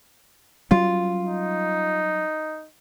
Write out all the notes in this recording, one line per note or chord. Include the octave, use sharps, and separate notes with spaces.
F#3 G3 C#4 F4
D#4